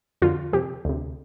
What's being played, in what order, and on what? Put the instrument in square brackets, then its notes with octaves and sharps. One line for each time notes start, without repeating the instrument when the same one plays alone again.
[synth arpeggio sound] F2 D3 F4
F2 C3 G4
D2 C3